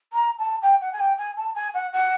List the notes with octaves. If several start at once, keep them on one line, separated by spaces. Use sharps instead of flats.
A#5
A5
G5
F#5
G#5
G5
G#5
A5
G#5
F#5
F#5